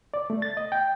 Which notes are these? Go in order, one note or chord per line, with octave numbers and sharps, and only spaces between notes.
D5
A3
A6
D#5
G5